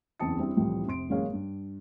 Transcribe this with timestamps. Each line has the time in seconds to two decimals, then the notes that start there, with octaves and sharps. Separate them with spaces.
0.20 F#1 E2 C4 A5 D#6 C#7
0.38 G3 C4 D4 E4
0.56 C2 A2 E3 F3 G3
0.86 F1 C3 C6 D7
1.10 A1 F#2 G#3 A#3 C#5 F5
1.33 G2